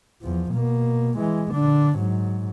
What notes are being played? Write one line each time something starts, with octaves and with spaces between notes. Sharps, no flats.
E2 F3
B2 A#3
E3 G#3
D3 D4
G#2 F#3